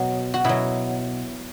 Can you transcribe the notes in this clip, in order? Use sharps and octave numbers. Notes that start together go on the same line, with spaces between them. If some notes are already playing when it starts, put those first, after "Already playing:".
Already playing: B2 F#3 F#4
F#4
B2 F#3 E4